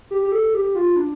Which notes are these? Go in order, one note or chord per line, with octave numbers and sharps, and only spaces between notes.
G4
G4
A4
G4
F4
D4